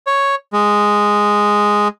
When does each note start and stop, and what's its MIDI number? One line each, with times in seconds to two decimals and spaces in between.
0.07 0.35 73
0.53 1.88 56